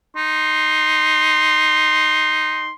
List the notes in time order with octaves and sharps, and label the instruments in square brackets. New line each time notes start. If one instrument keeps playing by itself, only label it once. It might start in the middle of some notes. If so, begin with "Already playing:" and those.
[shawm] D#4 [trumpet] C6